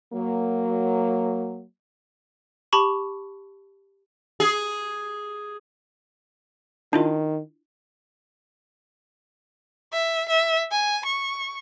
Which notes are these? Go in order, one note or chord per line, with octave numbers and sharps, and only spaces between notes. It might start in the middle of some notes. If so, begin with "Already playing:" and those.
F#3 A#3
G4 A5 B5 C#6
G#4
D#3 D4 E4 F4
E5
E5
G#5
C#6